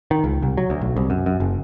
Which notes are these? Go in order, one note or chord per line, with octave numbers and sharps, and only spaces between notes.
D#3
C#2
C2
F#3
D2
B1
C2
F#2
F#2
F#1